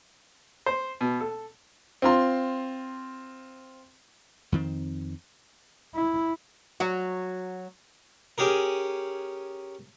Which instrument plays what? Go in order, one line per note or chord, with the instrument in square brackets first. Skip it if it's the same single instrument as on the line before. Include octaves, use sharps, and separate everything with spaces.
[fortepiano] C5
B2
A4
[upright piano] C4 F4 C6
[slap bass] F2 D#3 C4
[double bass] E4
[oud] F#3 F#4
[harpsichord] C#4 G4 G#4 A#4